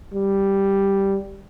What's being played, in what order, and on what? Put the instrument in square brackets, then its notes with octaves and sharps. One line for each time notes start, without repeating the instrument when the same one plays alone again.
[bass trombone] G3